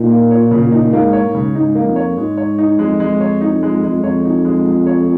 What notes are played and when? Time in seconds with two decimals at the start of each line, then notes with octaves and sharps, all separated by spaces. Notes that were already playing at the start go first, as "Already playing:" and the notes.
Already playing: A#2 D#4
0.10 A#3
0.31 C#5
0.51 C#3
0.72 D#4
0.93 G#2 A#3
1.13 C#5
1.24 G#2
1.35 C#3
1.55 G#2 D#4
1.75 A#3
1.85 F2
1.96 C#5
2.17 G#2 G#3
2.38 C#5
2.58 D#4
2.79 F2 G#3
3.00 G#3
3.20 C#5
3.41 D#4
3.63 G#3
3.83 G#3
4.04 F2 C#5
4.25 D#4
4.45 G#3
4.66 G#3
4.86 C#5